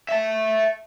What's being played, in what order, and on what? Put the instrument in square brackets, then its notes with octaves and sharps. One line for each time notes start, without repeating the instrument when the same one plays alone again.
[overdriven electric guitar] E5 A5